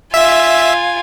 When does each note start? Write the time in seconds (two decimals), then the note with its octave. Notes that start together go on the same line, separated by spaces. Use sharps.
0.14 F4 E5 G#5